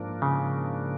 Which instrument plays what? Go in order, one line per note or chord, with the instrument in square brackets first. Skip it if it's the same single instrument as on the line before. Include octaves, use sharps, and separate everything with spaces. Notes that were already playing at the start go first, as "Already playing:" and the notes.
Already playing: [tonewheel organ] G#2 F3 A#3 D4
[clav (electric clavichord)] C#3